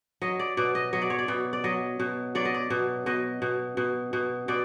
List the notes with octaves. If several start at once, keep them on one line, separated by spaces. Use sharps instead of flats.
F#3 D#5
D5
B2 D5
D#5
F#3 D#5
D5
C#5
D5
B2
D5
F#3 D#5
B2
F#3 D5
D#5
D5
B2
B2 D#5
B2
B2
B2
B2 D5